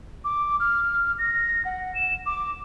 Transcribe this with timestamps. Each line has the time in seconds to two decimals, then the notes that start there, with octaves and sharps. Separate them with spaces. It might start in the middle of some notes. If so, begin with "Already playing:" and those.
0.24 D6
0.60 F6
1.19 A#6
1.65 F#5
1.95 E7
2.26 D6